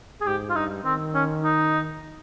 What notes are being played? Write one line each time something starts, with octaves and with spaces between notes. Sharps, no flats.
G#4
G#2 G4
F4
G2 D#4
D#3 C4
C#4
D#4